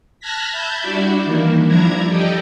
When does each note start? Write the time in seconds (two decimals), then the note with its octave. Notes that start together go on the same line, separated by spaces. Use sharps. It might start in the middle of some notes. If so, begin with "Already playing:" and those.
0.20 A5 F6 F#6 G#6 A#6 B6
0.52 E5 A5 B5 G6 G#6
0.82 G3 D4 E4 F#4 D5 E5
1.24 D#3 E3 A#3 E4
1.65 G2 F3 D4 E4 A#5 G#6
2.09 G4 A4 D5 D#5 G5